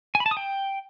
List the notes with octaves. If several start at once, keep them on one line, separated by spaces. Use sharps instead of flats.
G#5
B5
A5
D#6
G5